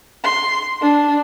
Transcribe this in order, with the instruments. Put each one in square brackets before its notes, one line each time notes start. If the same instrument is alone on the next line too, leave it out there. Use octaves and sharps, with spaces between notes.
[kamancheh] C6
D4